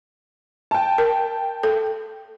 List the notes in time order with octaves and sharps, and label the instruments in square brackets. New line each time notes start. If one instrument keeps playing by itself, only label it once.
[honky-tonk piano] G5 A5
[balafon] A#4
A4